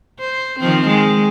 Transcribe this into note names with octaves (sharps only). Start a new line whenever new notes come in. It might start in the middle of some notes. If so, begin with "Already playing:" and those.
C5
D#3 F3 C4
G#3